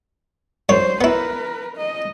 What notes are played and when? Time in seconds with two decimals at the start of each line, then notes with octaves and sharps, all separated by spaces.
0.69 F#2 C5 C#5
1.01 B3 E4 A#4 B4
1.77 D#5